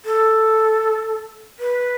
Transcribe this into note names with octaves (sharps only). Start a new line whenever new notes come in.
A4
B4